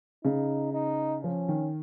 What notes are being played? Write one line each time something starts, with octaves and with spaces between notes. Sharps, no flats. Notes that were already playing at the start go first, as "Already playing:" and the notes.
C#3 D#4
D#4
F3 C#4
D#3